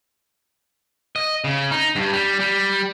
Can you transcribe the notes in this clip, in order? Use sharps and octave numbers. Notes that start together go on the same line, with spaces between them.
D#5
C#3
D#4
G2
G3
G3